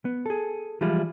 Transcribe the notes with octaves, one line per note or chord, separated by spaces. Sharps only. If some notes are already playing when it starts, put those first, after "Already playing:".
B3
G#4 A4
E3 F3 G3 G#3 E4 F4